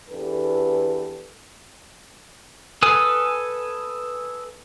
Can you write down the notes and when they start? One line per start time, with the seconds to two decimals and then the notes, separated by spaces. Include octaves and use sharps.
0.11 E2 D4 G4 A4 B4
2.83 A4 B4 G#5 D#6